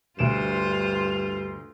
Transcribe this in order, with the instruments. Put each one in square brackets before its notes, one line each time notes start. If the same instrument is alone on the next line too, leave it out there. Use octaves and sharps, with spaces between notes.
[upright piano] D2 D7 E7 [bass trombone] G2 [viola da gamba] F4 C5